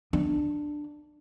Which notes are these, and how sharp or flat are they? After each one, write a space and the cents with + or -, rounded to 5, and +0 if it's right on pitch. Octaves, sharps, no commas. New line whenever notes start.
D4 +10